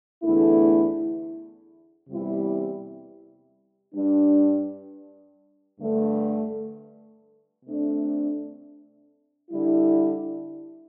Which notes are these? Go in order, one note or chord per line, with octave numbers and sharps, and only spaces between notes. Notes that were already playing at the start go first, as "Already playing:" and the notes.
E2 D3 A3 E4
E2 C3 G3 E4
G2 G3 D4
G2 D3 A3
C3 A3 D4
D3 G3 E4